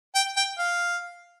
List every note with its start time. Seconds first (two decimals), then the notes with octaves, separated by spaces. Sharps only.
0.15 G5
0.37 G5
0.58 F5